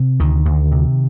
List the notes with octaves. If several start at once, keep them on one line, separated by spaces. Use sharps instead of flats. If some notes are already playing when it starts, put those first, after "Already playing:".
Already playing: C3
D2 D#3
D2
C3